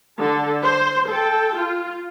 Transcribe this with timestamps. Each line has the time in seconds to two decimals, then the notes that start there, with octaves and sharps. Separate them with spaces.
0.20 D3 A4
0.63 C5
1.09 A4 G5
1.57 F4